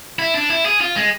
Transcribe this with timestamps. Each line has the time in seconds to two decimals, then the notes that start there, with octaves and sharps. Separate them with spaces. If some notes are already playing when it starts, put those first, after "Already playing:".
0.19 E4
0.34 D4
0.50 E4
0.65 G#4
0.81 F4
0.96 G#3